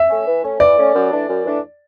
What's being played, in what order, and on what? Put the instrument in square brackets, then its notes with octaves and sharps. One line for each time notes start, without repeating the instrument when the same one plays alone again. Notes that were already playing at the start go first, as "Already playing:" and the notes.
Already playing: [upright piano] E5
[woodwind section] A3 C#4
E3
A3 C#4
[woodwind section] E3 [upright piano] D5
[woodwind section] A3 C#4
F#2
E3 A3 D4
F#2
E3 A3 D4